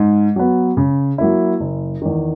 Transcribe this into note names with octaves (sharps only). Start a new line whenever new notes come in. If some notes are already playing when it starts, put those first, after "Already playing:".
Already playing: G#2
F#3 B3
C#3
F#3 A#3 E4
F#1
E2 D#3